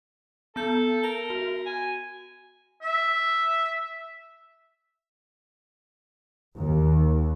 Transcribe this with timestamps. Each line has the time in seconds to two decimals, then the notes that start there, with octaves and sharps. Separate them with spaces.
0.56 B3 A4 G6
1.03 A#4 G7
1.30 F#4
1.66 G#5
2.82 E5
6.57 D#2